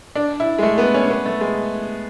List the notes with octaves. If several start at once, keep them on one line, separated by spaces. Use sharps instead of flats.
D4
E4
G#3
A3
B3
C#4
B3
A3
G#3